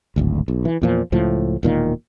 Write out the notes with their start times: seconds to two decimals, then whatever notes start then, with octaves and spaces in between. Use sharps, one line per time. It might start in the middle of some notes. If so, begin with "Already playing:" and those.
0.16 D1 G#1 D2
0.48 B1
0.65 E3
0.82 E2 A#2 F3
1.12 C#2 A2 F3
1.63 E1 A#2 D#3 A#3